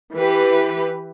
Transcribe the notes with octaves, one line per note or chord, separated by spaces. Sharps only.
E3 G4 B4